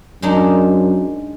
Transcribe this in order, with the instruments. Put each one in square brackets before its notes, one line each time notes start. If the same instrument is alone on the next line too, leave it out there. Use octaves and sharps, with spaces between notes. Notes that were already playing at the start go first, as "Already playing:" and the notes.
[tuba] F#2 [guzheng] G#3 D4 D#4